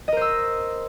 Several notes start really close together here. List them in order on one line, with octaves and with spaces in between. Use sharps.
D#5 A#4 C5 E6